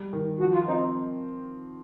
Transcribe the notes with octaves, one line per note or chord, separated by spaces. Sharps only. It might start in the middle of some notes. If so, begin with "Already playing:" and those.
Already playing: G3
D#3
F3 F#4
F4
C4 D#4